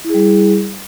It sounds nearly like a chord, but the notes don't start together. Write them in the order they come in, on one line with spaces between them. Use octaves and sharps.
E4 G#4 G3